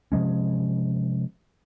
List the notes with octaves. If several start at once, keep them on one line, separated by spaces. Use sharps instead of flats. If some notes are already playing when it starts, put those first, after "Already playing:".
C3 F3 G#3 C#4